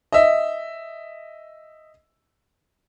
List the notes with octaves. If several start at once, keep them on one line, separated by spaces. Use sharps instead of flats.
D#5 E5